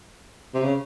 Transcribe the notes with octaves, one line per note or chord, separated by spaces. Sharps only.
C3
C#3